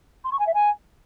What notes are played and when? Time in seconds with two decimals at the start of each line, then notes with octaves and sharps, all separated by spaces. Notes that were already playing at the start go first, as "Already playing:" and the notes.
0.24 C6
0.32 C#6
0.39 G#5
0.47 E5
0.54 G#5